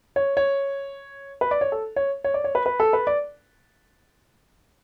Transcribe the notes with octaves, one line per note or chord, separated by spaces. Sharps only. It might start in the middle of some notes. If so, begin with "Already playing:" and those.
C#5
C#5
B4
D5
C#5
A4
C#5
C#5
D5
C#5
B4
B4
A4
B4
D5